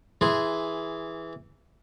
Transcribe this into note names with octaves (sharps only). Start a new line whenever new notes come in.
E3 G#4 C6